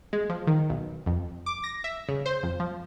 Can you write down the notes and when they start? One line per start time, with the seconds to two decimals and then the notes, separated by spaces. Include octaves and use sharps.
0.13 G#3
0.29 F3
0.47 D#3
0.70 B1
1.06 F2
1.46 D6
1.64 A#6
1.84 E5
2.08 C#3
2.26 C5
2.43 F2
2.60 F3